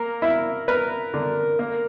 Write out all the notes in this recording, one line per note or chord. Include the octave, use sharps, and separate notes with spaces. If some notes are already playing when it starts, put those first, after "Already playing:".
Already playing: A#3 A#4
E4
A#4 B4
D3
A#3